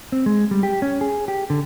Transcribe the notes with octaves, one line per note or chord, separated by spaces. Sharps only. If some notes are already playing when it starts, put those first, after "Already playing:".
C4
G#3
G3
G4
C#4
G#4
G4
D3